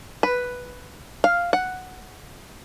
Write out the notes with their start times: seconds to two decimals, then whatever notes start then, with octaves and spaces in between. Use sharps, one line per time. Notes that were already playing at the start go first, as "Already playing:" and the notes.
0.23 B4
1.24 F5
1.53 F#5